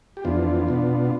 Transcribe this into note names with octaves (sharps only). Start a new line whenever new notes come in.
G4
F2 E3 B3 D4 F4
B2 B3 D4